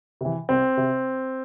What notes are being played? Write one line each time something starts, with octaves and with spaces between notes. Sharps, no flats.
C3 E3
C2 C4
C3